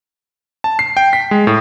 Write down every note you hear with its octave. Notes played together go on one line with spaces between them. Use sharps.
A5
C7
G5
B6
G#3
A2